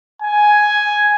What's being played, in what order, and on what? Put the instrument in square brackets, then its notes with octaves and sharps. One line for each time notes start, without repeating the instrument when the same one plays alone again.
[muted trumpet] G#5